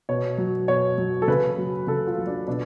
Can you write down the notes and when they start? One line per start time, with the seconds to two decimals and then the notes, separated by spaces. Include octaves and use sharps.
0.09 B2 C#5
0.38 F#3
0.68 B2 C#5
0.98 F#3
1.22 A4
1.28 C#3 B4
1.58 F#3
1.87 C#3 A4
2.07 F4
2.18 F#3
2.27 D4
2.47 B2 D4